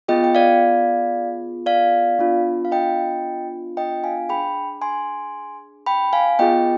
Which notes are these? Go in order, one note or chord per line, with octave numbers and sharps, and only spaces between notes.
B3 F4 G#4 D#5 G5
G5
D5 F5
D5 F5
B3 D4 F4
F5
D#5 G5
D#5 G5
F5 G#5
D4 G#4 G5 B5
G#5 C6
G5 B5
F5 G#5
B3 F4 G#4 D#5 G5